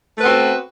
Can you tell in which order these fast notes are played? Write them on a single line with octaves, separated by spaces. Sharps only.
A3 B4 B3 C4 F#4